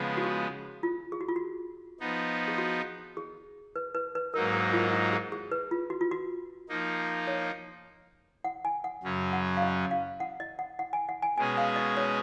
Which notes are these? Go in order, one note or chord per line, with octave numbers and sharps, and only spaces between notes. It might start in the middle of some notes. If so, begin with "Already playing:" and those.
Already playing: C#3 F3 G#3 B3
F#4
G#4
F4
G#4
F#4
F4
F#4
F3 B3 D#4
G#4
F#4
G#4
B4
B4
B4
G#2 F#3 A#3 D#4 A#4
A#4
F4
F#4
G#4
G#4
B4
F4
F#4
F4
F#4
F3 A#3 D#4
C#5
F#5
G#5
F#5
F#2 C#3 F#3 C#4
F#5
F5
D#5
F5
F#5
D#5
F#5
F#5
G#5
F#5
G#5
B2 G#3 C#4 G#4 G#5
F5
D#5
C#5